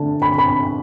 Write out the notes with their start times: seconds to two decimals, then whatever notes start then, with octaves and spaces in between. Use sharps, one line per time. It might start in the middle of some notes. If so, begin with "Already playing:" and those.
Already playing: D3 A3 D4 A5
0.22 B5
0.38 B5